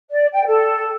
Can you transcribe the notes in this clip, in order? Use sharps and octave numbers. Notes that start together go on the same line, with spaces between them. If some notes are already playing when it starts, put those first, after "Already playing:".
D5
G5
A4